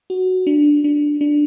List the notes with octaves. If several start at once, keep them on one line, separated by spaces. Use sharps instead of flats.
F#4
D4
D4
D4